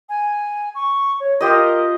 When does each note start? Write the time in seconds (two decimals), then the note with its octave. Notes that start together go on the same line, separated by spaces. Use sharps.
0.09 G#5
0.75 C#6
1.20 C#5
1.40 F4 G4 A#4 D#5